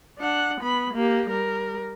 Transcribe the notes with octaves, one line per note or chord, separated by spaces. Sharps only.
D4 F#5
B3 B5
A#3 G4
G3 A#4